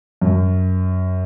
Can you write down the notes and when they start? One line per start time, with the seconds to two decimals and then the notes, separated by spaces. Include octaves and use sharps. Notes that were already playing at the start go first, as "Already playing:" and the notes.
0.22 F#2